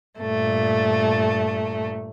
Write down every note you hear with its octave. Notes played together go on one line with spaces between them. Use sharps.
G2 A#2 A3